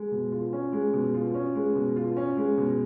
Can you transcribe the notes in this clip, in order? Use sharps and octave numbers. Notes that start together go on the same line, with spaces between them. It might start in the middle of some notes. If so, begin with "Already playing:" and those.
Already playing: G#3
B2
F4
C#4
G#3
B2
F4
C#4
G#3
B2
F4
C#4
G#3
B2